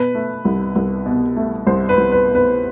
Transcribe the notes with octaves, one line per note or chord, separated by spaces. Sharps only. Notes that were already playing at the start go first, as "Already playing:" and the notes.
Already playing: B2 B4
A3
C2
C2
B2
A3
C2 C5
B4
C2
B4
B2
B4